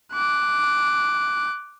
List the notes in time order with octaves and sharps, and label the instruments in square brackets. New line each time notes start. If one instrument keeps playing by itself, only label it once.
[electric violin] D6 F#6